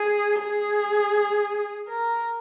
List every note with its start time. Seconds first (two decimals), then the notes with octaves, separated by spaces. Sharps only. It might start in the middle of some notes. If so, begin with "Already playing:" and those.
Already playing: G#4
0.40 G#4
1.89 A#4